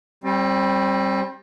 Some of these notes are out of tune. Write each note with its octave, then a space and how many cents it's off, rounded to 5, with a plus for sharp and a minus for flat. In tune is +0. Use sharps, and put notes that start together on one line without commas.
G3 +0 C4 +35